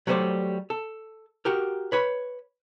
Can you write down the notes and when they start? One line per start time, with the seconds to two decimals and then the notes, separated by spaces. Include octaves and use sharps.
0.07 F#3 G3 A3 B4 C5 D5
0.70 A4
1.45 F#4 G4 A#4
1.92 B4 C#5 B5